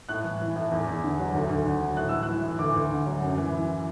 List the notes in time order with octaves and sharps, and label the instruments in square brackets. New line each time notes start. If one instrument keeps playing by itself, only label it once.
[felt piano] A2 F#6
E3
E3
A2
E2
E2
D3
F#3
D2
D2
D3
F#3
A2 F#6
E3 E6
F#6
E3
A2
D2 D6
D2
D3
F#3
F#2
E3
E3